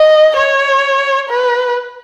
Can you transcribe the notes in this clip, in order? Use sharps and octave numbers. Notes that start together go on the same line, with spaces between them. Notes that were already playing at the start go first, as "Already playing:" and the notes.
Already playing: D#5
C#5
B4